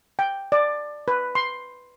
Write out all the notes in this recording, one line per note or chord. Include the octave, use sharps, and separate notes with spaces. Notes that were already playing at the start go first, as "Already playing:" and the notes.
G5
D5
B4
C6